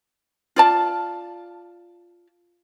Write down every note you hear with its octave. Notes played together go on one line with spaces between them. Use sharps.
F4 D5 A5